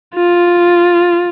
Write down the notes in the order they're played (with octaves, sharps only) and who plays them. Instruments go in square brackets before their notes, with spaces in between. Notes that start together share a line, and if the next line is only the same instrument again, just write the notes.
[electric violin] F4